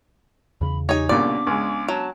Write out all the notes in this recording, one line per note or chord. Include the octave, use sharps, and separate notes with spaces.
E2 C#3 B5
D#4 G4 C#5 G#5
C2 G2 A#2 C#3 B3 D4 D5 D6
C#2 G#3
F#3 A5